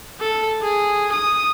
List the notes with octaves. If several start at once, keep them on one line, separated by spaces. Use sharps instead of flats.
A4
G#4
D#6